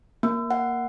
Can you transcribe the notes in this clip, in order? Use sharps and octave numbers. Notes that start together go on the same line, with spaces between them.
A#3
F#5